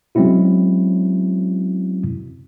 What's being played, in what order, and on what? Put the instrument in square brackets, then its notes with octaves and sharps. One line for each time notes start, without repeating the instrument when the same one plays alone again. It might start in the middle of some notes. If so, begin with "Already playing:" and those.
[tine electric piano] F#3 G#3 C4 C#4 E4 F#4